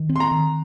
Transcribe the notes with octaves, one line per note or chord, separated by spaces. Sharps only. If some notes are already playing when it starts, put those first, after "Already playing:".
Already playing: D#3
C4
C6
A#5
D#3